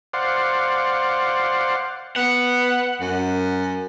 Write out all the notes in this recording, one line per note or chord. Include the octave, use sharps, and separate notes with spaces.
C5 D5 F5 F#5
B3 F#5
F#2